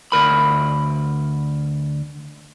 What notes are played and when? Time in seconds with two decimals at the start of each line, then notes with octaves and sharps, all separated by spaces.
0.12 D2 A#4 B5